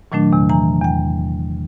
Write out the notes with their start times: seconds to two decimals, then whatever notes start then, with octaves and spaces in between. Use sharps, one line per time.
0.12 A#2 D#3 F#3 A3 D4
0.33 E2 C3
0.49 E3 G#5 A#5
0.81 E2 G5